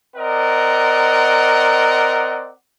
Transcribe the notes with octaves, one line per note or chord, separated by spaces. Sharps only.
C4 A#4 D5 D#5 F#5